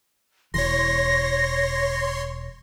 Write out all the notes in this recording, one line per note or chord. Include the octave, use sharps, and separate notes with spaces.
E1 E3 C#5 C6 A#6